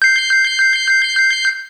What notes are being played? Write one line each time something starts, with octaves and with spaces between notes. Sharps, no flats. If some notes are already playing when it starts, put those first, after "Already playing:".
G6 C7